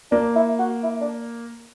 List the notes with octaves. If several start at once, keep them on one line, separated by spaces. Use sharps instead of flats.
A#3 D4
E4
F#4
E4
D4